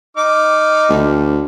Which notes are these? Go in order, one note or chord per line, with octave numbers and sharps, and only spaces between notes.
D#4 D6 F6
D2